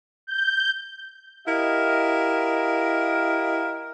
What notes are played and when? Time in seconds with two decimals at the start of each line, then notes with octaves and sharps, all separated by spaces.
0.27 G6
1.47 E4 G4 A#4 D#5 F5